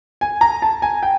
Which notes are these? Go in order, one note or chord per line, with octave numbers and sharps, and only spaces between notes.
G#5
A#5
A5
G#5
G5